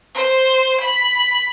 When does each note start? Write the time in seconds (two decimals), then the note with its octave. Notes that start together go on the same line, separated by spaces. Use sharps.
0.15 C5
0.81 B5